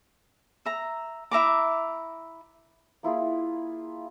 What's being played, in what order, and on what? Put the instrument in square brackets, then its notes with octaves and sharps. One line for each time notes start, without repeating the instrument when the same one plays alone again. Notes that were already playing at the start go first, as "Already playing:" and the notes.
[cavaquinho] E5 A#5
E4 E5 A#5 D6
[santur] A#3 E4 F4 G#4